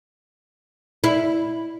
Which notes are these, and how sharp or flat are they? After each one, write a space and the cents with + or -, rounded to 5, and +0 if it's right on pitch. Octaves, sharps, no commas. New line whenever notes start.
E4 -5